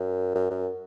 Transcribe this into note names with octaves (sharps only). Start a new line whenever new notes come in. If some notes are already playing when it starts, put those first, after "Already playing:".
Already playing: F#2
F#2
F#2